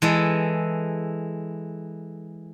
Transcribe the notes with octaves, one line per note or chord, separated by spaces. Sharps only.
E3 G#3 A4